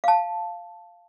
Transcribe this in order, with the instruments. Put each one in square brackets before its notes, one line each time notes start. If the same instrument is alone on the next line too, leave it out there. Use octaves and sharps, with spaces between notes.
[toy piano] F5 A5